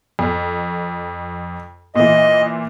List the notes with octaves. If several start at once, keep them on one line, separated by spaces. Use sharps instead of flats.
F2
A#2 E3 D#5